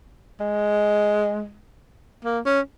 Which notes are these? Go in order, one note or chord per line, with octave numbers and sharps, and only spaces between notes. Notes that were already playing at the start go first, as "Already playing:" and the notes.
G#3
A#3
C#4